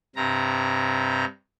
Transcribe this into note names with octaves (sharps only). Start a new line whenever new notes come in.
G2 C3 A#5